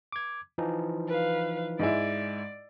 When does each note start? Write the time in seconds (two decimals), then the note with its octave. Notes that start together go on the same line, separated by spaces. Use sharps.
0.12 D6 G#6
0.58 E3 F3 D#4
1.08 B4 F5
1.79 G#2 G#3 E4 D5